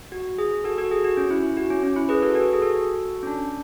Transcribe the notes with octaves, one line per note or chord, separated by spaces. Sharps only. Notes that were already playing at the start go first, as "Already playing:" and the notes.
F#4
G#4
F#4 A4
F#4 A4
G#4
F#4
C#4
E4
E4
F#4
C#4
C#4
E4
G#4 B4
F#4 A4
F#4 A4
G#4
F#4 A4
C#4
D4